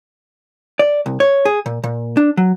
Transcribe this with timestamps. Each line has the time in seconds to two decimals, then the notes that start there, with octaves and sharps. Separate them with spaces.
0.79 D5
1.06 C2
1.20 C#5
1.45 G#4
1.66 A#2
1.84 A#2
2.17 D4
2.37 F#3